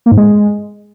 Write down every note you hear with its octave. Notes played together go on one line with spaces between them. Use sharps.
A#3
G#2
G#3